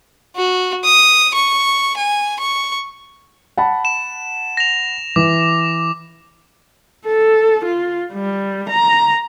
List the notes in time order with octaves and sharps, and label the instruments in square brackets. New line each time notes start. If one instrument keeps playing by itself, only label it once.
[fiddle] F#4
D#6
C#6
G#5
C#6
[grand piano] F#5 A5 B5
[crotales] E7
A#6 F7
[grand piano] E3 [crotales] D6
[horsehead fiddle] A4
F4
G3
A#5